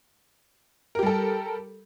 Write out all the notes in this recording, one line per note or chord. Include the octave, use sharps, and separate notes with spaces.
G3 G4 A4 A#4